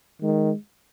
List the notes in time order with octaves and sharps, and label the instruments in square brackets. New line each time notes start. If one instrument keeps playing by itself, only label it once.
[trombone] D#3 [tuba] G#3